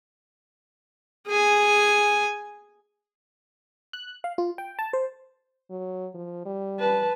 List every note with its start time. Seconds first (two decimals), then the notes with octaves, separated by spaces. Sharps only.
1.28 G#4 G#5
3.93 F#6
4.24 F5
4.38 F4
4.58 G5
4.79 A5
4.93 C5
5.70 F#3
6.14 F3
6.46 G3
6.79 B4 A5